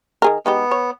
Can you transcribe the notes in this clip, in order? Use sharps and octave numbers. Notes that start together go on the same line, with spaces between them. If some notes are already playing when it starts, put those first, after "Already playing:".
D#3 G#4 A#4
G#3 B3 D#4 G4
C#5